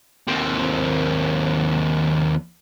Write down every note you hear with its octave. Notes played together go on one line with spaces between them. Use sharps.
D#2 C4